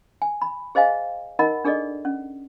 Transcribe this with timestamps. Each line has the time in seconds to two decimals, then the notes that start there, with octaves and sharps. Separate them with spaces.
0.22 G#5
0.42 B5
0.75 G#4 C5 D#5 F5 G#5
1.39 D#4 A#4 D#5 F#5 B5
1.65 D4 G#4 A4 D5 D#5
2.05 C#4